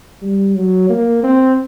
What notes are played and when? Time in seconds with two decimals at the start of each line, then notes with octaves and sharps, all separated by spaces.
0.22 G3
0.55 F#3
0.89 A#3
1.23 C4